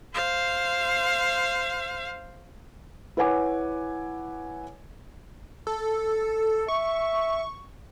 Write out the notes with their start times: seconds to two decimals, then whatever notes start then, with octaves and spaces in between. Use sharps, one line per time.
0.14 C5 F5
3.17 E4 B4 C#5 F#5 G#5 D6
5.67 A4
6.68 E5 C#6